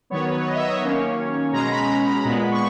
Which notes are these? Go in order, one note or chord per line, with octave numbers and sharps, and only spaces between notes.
D#3 F#3 B3 C#5
B4
C#5
D#5
E5
D#5
C#5
D#3 F#3 A#3 C#4
B2 G#3 C#4 A#5
B5
B5
B5
A#2 G#3 B3
C#6